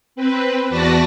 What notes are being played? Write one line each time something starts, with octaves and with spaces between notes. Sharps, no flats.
C4 B4
E2 F#4 B4 D5 A5 A#6